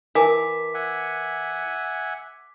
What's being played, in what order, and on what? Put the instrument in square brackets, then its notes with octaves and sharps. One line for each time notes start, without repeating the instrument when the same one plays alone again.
[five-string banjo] E3 [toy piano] A#4 A5 [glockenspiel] D6 B6
[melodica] E5 F#5 G#5